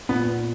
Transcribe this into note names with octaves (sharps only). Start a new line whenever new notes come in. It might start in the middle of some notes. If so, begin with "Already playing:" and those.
A#2 B3